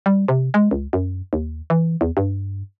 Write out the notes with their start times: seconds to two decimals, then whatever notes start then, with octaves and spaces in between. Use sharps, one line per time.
0.06 G3
0.28 C3
0.54 G#3
0.71 C#2
0.93 F#2
1.33 D#2
1.70 E3
2.01 E2
2.17 G2